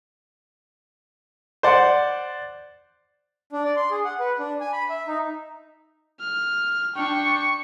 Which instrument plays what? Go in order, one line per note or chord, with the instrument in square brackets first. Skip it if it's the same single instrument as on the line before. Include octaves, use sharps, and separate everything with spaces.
[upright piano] C5 D5 F#5
[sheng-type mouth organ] D4
D5
C6
G#4
F#5
B4
D4
G#5
B5
E5
D#4
[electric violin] F6
[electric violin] D4 G5 [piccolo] C#6